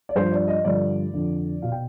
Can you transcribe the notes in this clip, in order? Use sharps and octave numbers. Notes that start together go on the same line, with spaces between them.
D5
G2 F3 C5
D5
D#5
G2 D3 F3 D5
F2 D3 F3
B2 F5
G5